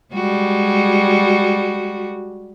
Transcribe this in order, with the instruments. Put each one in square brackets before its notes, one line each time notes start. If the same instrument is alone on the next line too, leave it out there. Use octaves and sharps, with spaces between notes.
[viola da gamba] G3 G#3 F#4